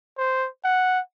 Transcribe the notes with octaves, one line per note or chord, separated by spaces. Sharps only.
C5
F#5